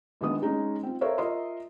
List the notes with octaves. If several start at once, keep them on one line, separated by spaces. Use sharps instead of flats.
A#1 D#3 G#3 B3 D#6
G#3 C#4 D#4 G#4
C4 F4
A4 A#4 C5 C#5 E5 F5
F4 A#4 D#5 E5 C6